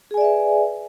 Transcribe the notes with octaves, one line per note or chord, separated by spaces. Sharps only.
G#4 B4 D5 E5 G#5